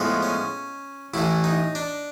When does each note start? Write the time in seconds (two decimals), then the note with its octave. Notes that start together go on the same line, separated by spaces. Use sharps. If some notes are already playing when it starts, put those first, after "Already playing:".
Already playing: A2 F3 G#3 B3
0.23 C#4
1.14 A1 A2 E3 E4
1.44 D#4
1.75 D4